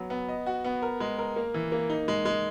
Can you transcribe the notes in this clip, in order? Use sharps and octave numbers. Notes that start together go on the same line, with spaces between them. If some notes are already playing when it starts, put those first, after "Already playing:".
Already playing: F#3 B3
B3
D#5
F#4
B3
A#4
G#3
A#4
A#3
E3
A#3
D#4
G#3
G#3